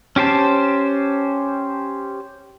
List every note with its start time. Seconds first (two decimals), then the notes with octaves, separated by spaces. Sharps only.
0.16 C#4 G4 C5 A5